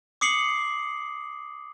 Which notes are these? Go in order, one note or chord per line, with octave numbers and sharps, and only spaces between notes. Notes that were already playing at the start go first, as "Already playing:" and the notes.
D6 D#6 C7 C#7 F#7